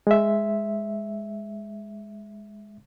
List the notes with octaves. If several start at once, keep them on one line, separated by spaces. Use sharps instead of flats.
G#3 E5